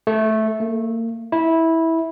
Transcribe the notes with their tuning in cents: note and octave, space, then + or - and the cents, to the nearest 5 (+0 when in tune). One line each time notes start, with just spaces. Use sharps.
A3 -10
A#3 -35
E4 -15